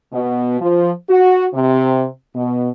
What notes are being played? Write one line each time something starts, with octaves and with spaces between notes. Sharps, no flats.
B2
F3
F#4
C3
B2